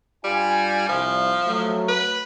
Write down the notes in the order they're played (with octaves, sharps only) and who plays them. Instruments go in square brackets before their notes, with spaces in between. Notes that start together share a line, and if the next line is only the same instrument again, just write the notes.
[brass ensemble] G2 F4 G#5 [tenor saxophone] G3
[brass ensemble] C2 [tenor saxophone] F3
[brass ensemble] F#3 A3
[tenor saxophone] B4